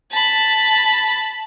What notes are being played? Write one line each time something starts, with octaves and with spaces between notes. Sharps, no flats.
A5 B5